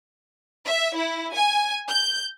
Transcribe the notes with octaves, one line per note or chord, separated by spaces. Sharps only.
E5
E4
G#5
G6